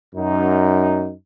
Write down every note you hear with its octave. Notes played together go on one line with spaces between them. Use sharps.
F#2 D#4